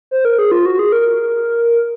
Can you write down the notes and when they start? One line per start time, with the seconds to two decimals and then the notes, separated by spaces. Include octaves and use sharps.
0.11 C5
0.25 A#4
0.39 G#4
0.51 F4
0.66 F#4
0.79 G#4
0.92 A#4